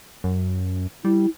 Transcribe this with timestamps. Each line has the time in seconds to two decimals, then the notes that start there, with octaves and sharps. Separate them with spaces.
0.24 F#2
1.05 G3 E4